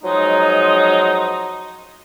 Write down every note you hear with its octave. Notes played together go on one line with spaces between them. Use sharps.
F3 F#3 G#3 D#4